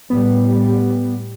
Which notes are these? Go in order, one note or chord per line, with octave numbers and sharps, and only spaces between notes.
A2 G3 B3